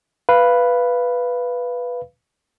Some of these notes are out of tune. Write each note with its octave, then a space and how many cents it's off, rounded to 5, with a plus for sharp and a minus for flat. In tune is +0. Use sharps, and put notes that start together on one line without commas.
B4 +0 F5 -15